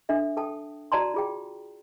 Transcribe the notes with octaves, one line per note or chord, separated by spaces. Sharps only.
D4 A4 E5
A4 G5 A5 D#6
F#4 D5 A5 A#5 C6
F4 G#4 G5